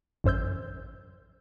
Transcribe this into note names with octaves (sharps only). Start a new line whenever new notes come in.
A1 F#2 C5 E6 G6